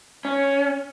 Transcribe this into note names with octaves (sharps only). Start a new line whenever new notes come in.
C#4